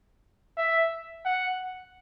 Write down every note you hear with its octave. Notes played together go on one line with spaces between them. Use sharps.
E5
F#5